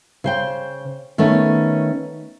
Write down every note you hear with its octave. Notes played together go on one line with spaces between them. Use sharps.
C#3 C5 G5
D#3 A3 B3 C#4